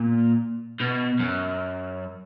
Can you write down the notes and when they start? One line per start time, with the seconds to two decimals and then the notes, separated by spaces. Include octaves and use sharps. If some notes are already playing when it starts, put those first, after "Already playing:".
Already playing: A#2
0.80 B2
1.20 F#2